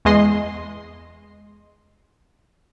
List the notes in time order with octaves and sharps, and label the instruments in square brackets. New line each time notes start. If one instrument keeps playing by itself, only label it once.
[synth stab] E2 G#3 D#5 C6